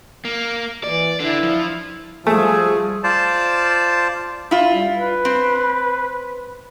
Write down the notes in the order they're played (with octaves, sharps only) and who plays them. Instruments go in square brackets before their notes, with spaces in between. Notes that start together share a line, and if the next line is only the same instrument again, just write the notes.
[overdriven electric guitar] A#3
[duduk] E3 [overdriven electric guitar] D5
[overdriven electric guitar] D4 A4 [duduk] E4
[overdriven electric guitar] F3
[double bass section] F3 G3 [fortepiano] A3 [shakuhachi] G#4 [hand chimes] G#5 E6
[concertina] F4 C5 D5 A5
[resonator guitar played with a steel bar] E4 F4
[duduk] G3
B4
[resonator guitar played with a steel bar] C4